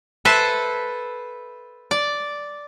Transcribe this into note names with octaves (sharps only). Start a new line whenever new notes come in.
A4 B4 C5 E5 G#5 A5
D5